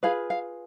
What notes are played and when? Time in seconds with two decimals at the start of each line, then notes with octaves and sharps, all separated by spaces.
0.03 F4 G#4 B4 F5
0.30 F5